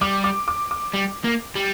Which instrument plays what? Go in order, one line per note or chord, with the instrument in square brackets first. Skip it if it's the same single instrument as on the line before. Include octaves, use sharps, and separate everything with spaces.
[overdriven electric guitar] G3 [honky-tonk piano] D6
[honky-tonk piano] D6
D6
D6
[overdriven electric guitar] G3
A#3
G3